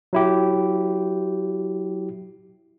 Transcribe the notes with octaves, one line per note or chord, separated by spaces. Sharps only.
F#3 E4 G4